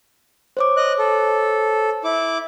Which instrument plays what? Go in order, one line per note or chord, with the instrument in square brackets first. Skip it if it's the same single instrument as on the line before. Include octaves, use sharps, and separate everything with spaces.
[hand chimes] C5 C#5 D6
[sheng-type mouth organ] D#5 F#6
A4
E4 D6